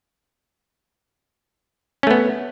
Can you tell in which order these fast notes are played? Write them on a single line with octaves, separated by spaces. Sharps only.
C#4 A3 B3